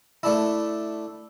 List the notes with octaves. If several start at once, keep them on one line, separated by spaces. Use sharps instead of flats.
A3 D4 E4